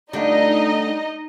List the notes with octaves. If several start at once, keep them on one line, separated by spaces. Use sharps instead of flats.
D3 G3 A3 D4 D#4 F4 D#5